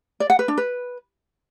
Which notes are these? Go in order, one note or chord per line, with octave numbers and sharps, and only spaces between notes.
D5
F#5
B4
D4
B4